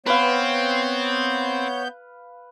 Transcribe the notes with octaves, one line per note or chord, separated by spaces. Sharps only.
B3 C4 B4 C#5 F5 G6